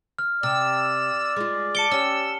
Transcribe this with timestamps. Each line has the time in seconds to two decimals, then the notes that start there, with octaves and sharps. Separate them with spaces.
0.19 F6
0.43 C3 D5 E6
1.36 G#3 F4
1.75 A5 D6 C#7 G7
1.91 C#4 G4 E6